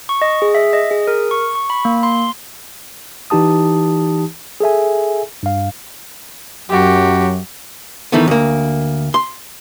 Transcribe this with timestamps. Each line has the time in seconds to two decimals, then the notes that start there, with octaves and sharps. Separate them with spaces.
0.09 C#6
0.22 D#5
0.42 G#4
0.55 E5
0.73 D#5
0.91 G#4
1.07 A#4
1.31 C#6
1.55 C#6
1.70 B5
1.85 A#3
2.03 C6
3.30 E3 D#4 G4 A5 D#6
4.60 G#4 A4 E5 G#5
5.43 G2 F5
6.69 F#2 F#3 F#4 G4
8.12 D#3 E3 A3 B3
8.27 D2 A#3
9.14 C6